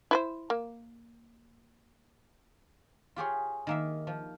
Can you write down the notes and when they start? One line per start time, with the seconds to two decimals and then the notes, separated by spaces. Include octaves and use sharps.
0.11 E4 B4 C5
0.50 A#3
3.16 F4 G4 G#4 C#5
3.67 D#3 A#3 E5
4.07 F3